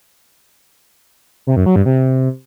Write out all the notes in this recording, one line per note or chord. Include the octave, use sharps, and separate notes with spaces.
C3
F#2
F#3
G2
C3